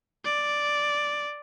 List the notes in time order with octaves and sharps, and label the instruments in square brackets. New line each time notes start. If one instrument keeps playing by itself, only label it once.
[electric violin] D5